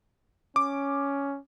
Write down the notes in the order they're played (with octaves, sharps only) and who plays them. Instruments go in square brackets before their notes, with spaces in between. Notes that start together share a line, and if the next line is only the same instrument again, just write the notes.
[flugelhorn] C#4 [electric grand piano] D6